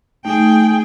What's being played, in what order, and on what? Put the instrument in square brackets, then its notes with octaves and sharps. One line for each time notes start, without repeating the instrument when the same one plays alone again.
[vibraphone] A3 D#4 [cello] G#4 G5